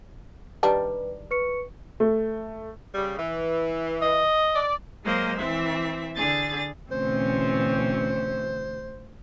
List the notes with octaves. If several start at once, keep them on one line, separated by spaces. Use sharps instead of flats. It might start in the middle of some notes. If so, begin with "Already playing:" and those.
D#3 G3 D4 B4
B4 C#6 C#7
A3
C#3 G3
E3
D#5
D5
F#3 G#3 A#3 C5 D#5
E3 C4 E5
D3 G#4 A6
D2 B2 E3 C4 C#4 C5